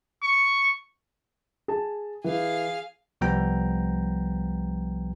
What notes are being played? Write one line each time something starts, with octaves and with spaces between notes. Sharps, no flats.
C#6
G#4 A5
E3 G#4 F5
C2 F3 G3 B3 G5 A#5